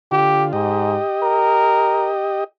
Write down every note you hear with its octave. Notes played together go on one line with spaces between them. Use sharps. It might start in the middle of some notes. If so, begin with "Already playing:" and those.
D3 F4 G4
G#2 G4 D#5
A#4